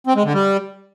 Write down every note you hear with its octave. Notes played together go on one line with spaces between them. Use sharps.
C4
G#3
D3
G3